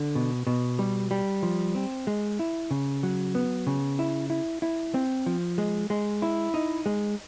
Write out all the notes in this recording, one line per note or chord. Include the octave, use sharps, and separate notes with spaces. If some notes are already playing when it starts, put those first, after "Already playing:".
Already playing: D3
B2
B2
G3
G3
F3
C4
G#3
E4
C#3
F#3
B3
C#3
E4
E4
E4
C4
F3
G#3
G#3
E4
D#4
G#3